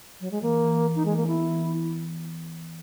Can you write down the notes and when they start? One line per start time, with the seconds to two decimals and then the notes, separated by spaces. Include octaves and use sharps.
0.21 F#3
0.31 G#3
0.42 E3 A#3
0.63 E3
0.84 E3
0.95 D#4
1.05 E3 G#3
1.17 A#3
1.27 B3 E4
1.48 E3